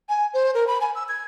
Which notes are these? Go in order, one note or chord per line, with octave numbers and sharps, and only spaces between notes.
G#5
C5
A#4
B5
G#5
E6
G#6